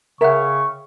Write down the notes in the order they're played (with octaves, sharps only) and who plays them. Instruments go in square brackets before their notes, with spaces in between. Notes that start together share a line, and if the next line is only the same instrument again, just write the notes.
[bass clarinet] C#3 [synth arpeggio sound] A#4 F#5 [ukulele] C#5 E5 G5 [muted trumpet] C#6